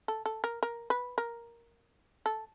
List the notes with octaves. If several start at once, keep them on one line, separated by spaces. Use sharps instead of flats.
A4
A4
A#4
A#4
B4
A#4
A4